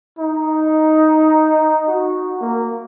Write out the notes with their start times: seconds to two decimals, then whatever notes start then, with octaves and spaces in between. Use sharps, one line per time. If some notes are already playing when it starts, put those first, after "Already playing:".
0.18 D#4
1.87 F#4
2.41 A#3